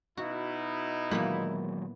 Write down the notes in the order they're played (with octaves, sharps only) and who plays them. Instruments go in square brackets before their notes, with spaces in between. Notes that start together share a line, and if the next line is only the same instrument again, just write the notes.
[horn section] B2 D#4 E4 [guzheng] F#4
[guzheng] A#2 E3 B3 [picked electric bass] D#3 F#3 G#3